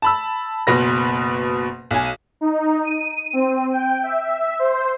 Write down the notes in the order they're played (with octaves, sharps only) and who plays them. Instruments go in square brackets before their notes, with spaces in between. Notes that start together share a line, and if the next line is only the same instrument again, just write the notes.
[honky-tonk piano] A5 B5 E6
F#1 B2 B4 A#6
B1 G#5
[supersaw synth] D#4
D#7
C4
G5
E5
C5